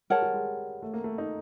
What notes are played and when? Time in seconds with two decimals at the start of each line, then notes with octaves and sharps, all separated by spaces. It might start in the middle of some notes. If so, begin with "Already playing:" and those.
0.10 G#3 A#4 C#5 F#5 A5
0.22 G3
0.34 G#3
0.82 A3
0.93 A#3
1.04 A3
1.18 D#4